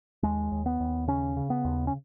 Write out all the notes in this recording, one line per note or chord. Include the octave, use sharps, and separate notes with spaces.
D#2 G#3
D#2
B3
D#2
C#3 C#4
C#3
B3
D#2
C#4